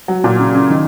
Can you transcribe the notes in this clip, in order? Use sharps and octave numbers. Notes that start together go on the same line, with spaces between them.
F#3
A#2
C#3
C#3
D#3